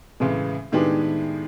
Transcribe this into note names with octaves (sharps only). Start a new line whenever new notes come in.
A2 C#3 E3 G#3
A2 D#3 G#3 B3 D4 G4